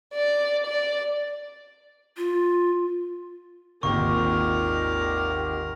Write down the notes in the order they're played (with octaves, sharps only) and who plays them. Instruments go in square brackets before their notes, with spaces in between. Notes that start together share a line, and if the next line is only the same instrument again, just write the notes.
[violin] D5
D5
[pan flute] F4
[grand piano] G#1 D#2 [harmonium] A#2 G4 [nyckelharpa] A#4 [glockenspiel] C#6